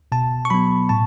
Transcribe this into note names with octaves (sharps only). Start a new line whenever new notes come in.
B2 A5
C#6
F#3 B3 B5
A2 A5